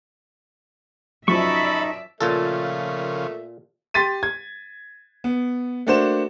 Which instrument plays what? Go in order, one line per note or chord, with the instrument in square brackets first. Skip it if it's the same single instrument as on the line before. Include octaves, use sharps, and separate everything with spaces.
[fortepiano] F#2 F3 [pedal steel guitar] D#4 C#6 [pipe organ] A4 B5 [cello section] D5 E5
[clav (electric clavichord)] A#2 F4 A4 [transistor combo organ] C#3 F3 [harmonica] A3 A#3 E5
[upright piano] G4 C6 A6 B6 D#7
G#6
B3
A3 A#3 D4 F#4 C5 E7